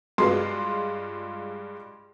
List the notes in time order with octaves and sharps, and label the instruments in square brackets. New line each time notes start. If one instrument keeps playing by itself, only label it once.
[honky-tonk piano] G2 G#3 F4 [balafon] F#4 G#4 B4 [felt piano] C6